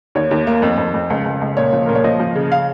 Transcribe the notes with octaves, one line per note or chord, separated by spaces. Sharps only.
D#2 C#5
D#2
A#3
F2
F2
F2
C#2
C#2
C#2
A#2 C#5
F3
A#2 A#4
C#5
F3 D#5
F3
C#3
F5